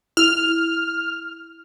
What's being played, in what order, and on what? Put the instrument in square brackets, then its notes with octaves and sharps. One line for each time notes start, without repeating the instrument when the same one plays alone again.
[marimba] E4 [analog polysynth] F6